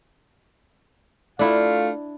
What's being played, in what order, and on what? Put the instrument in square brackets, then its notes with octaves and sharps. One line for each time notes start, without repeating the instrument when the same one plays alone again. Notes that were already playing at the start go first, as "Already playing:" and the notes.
[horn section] A3 F4 F5 [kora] D4 E4